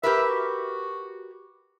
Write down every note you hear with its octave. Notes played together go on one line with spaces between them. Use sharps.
G4 A#4 B4 E5
F#4